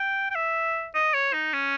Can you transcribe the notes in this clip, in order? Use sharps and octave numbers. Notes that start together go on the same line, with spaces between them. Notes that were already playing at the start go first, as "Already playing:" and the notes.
Already playing: G5
G5
E5
D#5
C#5
D#4
C#4